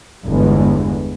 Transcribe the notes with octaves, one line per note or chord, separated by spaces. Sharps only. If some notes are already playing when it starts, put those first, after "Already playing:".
G1 E2 D3 G#3 B3